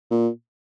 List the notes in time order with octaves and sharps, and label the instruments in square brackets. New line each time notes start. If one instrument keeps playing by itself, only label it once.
[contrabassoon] A#2